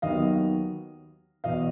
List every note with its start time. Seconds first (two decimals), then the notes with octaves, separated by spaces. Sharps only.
0.02 D#2 D#3 F#3 B3 D#5 F5
1.44 E2 B2 D#5 F5